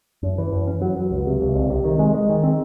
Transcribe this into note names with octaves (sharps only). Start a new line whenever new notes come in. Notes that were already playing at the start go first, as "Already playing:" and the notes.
F#2
E3
F#2
C#4
F#3
F#3
C#2
C3
C#2
C2
C3
D#3
G#3
G#3
D#3
C4